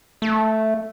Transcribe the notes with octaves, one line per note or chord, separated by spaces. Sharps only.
A3